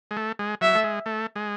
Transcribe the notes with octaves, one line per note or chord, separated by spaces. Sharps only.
G#3
A3
G#3
F#3 E5
A3
G#3
A3
G#3